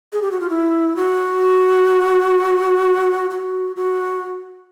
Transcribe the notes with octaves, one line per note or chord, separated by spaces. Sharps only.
G#4
G4
F#4
F4
E4
F#4
F#4
F#4